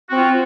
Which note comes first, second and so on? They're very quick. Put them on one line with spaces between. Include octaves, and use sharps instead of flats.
F#4 C4 F4